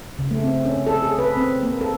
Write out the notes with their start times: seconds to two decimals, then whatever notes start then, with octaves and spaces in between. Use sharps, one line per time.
0.19 C#3
0.31 A3
0.44 C4
0.66 C#4
0.87 A4
1.03 G#4
1.19 B4
1.37 C4
1.63 A#3
1.81 A4